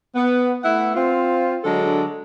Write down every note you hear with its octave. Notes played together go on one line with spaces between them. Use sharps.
B3
A3 B3 E4 F#5
C4 F4
D3 F#3 G#3 D4 A4